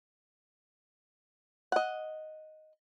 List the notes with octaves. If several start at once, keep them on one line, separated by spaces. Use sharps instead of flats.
D#5 F#5